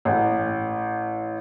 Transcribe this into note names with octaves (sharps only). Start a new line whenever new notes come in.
A1